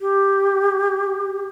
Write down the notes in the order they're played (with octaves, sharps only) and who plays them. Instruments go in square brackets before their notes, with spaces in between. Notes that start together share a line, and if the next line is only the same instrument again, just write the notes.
[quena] G4